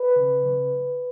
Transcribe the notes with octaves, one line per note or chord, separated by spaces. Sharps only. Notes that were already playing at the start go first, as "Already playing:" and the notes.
Already playing: B4
C#3
C#3